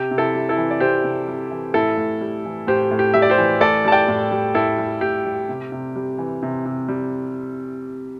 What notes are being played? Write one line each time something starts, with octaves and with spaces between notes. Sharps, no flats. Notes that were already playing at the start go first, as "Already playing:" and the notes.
Already playing: C3 G4
C3
E4 A4
G3
E4 A4
E3
D5
C3 G4 C5
C3
G3
E3
A2 E4 A4
A2
G3
E3
A2 G4 C5
A2
G4
G3 E5
D5
G4 C5
E3
A2 A4 D5
G3 A5
D5 G5
A2
G3
A2 E4 A4
G3
A2 G4
G3
C3
C3
G3
E3
C3
C3
G3